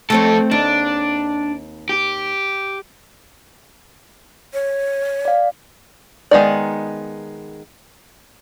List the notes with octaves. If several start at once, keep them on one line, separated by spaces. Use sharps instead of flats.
F2 A3 C4 A4 C#5
D#2 D4
G4
C#5
D5 F5
D#3 G#3 B3 D#4 D5